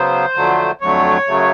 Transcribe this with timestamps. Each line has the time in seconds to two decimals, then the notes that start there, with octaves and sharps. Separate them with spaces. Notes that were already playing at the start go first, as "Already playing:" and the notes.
Already playing: C#3 F#3 B3 C5
0.35 F2 D3 F#3 A3
0.81 F2 D3 F#3 A3 C#5
1.27 F#2 C#3 F#3 A3